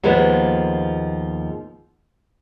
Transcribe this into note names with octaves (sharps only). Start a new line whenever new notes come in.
D#2 F3 G#3 A#3 B3